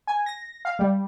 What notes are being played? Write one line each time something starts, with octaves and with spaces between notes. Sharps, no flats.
G#5
A#6
F5
G3